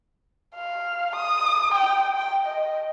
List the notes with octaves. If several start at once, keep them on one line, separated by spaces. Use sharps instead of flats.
F5
D#6
G5
G5
D#5